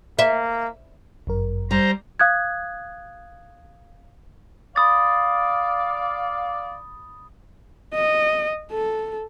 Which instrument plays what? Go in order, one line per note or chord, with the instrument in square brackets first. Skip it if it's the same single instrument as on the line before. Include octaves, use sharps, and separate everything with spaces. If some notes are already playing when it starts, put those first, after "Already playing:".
[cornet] A#3 [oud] E5
[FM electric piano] G1 F#2 A#4
[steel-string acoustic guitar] G3 [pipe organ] C5 A#5
[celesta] F5 D#6 F#6 G#6
[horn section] D5 F5 [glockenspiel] B5 D#6 A6
[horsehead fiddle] D#5
A4